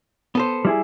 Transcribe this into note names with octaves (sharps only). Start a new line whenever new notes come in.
B3 A4 C5
G3 E4 G#4